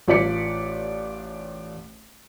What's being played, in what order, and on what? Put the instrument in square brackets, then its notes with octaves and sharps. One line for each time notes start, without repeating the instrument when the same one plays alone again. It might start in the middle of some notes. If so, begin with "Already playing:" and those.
[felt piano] A1 F4 B4 D5 B6 C#7